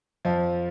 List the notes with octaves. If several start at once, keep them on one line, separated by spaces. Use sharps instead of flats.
F2 F3